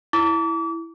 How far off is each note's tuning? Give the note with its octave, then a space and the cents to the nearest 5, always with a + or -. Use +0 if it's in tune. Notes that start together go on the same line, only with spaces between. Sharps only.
E4 +0 D6 -35